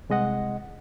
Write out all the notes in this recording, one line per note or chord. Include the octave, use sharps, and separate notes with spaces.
C2 G#3 D#5 F#5